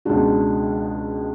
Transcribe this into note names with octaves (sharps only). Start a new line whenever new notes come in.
C#2 B2 G#3 D4 F#4